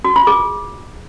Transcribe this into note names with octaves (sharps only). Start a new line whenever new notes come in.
F#4
F4
G#4